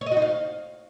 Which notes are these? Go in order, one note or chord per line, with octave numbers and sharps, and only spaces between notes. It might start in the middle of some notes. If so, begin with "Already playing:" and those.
C#5
D#5
F#4
D#4
F5